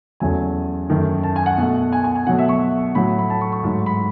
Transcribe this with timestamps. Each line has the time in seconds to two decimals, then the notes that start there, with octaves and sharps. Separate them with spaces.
0.20 E2 C#3 F#3 A3 G#5
0.90 F#2 D#3 A3
1.23 A5
1.36 G#5
1.46 F#5
1.58 B2 A3 F#5
1.92 G#5
2.04 G#5
2.16 G#5
2.27 B2 F#3 A3 F#5
2.39 E5
2.49 C#6
2.95 A2 F#3 A3 B5
3.19 B5
3.30 A5
3.41 C#6
3.52 C#6
3.64 G#2 F#3 A3
3.86 B5